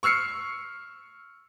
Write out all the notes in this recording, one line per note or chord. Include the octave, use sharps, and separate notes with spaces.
C#6 E6 F6 C7 C#7